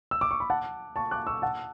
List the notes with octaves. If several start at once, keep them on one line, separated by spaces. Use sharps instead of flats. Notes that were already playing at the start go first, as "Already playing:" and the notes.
E6
D6
C#6
B5
F#5 A5
A5 C#6
D6 F#6
C#6 E6
F#5 A5